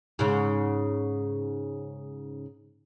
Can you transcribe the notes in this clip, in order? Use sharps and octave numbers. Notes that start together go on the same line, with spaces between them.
G#2 C#3